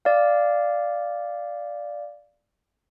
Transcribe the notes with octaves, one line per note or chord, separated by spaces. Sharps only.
D5 F5